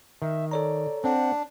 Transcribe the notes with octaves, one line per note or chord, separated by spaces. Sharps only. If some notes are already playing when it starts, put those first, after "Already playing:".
D#3 E5
A4 C#5 D5 A#5
C4 D4 F#5